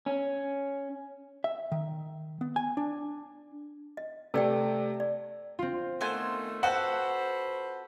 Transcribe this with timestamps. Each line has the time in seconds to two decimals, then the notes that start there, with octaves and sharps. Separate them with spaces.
0.06 C#4
1.44 E5
1.72 D#3
2.41 B3
2.56 G#5
2.77 D4
3.97 D#5
4.34 C3 A3 B4 D5 G5
5.00 D5
5.59 C4 F4
6.01 D#3 A3 B3 C5 G#5
6.63 F#4 A4 B4 C5 F#5